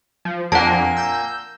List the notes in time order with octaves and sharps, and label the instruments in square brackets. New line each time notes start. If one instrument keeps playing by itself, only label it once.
[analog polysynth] F3
[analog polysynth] F2 D4 [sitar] A#2 A#3 [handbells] F#5 A5
[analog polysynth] E6 G6